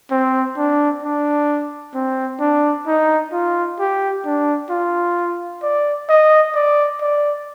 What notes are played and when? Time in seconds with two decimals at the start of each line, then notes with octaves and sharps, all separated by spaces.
0.11 C4
0.57 D4
1.03 D4
1.94 C4
2.40 D4
2.87 D#4
3.32 F4
3.80 G4
4.25 D4
4.70 F4
5.63 D5
6.09 D#5
6.55 D5
7.01 D5